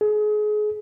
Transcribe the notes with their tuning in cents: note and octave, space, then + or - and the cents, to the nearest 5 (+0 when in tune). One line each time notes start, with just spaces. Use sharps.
G#4 +30